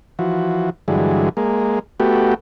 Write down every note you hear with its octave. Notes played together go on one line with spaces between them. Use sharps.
E3 F3 F#4
G2 D3 E3 F#3 G#3
G#3 A#3
A3 B3 F#4 G4